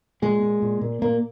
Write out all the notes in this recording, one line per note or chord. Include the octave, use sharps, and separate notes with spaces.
A#2 G#3
A#2
A#2
A#2
A#2 A#3